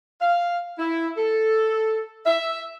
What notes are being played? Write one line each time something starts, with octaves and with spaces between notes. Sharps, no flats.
F5
E4
A4
E5